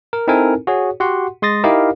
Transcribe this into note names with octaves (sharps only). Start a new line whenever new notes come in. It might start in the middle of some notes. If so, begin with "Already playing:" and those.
A#4
C4 D#4 E4 A4 A#4 G#5
F#4 G#4 C#5
F#4 G4 F#5 C6
G#3 C6 D#6 A6 A#6
D#4 E4 G4 A#4 D#5 F5